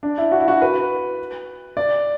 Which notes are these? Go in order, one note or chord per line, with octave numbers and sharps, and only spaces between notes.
D4
E4
F#4
E4
F#4
B4
D5